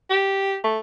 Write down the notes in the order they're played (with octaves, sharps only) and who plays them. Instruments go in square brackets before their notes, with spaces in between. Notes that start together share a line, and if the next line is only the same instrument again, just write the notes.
[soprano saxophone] G4
A3